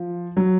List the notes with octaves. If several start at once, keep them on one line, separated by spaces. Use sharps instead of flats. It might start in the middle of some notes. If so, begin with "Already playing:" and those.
Already playing: F3
F#3